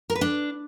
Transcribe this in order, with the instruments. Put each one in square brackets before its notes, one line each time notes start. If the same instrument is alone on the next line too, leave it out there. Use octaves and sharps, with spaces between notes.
[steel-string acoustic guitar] A#4
B4
D4